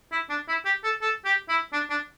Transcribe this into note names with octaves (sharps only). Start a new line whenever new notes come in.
E4
D4
E4
G4
A4
A4
G4
E4
D4
D4